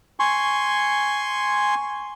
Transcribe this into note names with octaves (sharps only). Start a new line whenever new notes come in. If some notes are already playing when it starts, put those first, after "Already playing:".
G#5 C6 C#6